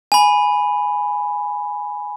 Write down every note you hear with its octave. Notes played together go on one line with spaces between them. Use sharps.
G#5 B5